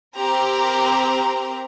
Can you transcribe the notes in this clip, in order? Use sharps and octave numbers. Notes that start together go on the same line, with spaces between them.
C4 G4 A#4 A#5